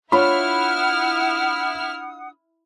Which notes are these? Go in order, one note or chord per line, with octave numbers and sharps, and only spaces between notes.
D4 E4 F4 C#5 F#5 B5 D#6 F6